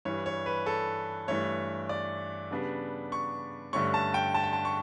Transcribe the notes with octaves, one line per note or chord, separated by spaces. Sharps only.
G2 E3 G3 C#5
C#5
B4
A4
G2 E3 A3 C#5
D5
C#3 G3 B3 D4
C#6
G2 D3 A3 C#4 C#6
A5
G5
A5
G5
A5
C#6